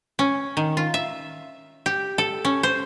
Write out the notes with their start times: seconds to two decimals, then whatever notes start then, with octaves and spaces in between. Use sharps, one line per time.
0.19 C#4
0.57 D#3
0.77 F4
0.94 E5
1.86 G4
2.18 A4
2.45 C#4
2.63 C5